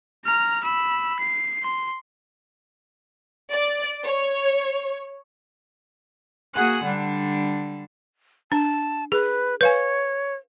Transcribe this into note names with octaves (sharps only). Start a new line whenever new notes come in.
A#5 F6
B5 E6
C7
C6
D5
C#5
A#3 F#4 G#4 F#5 G#5 F#6
D3 G3 D4
D4 A5
G#4 B4
B4 C#5 F5 G#5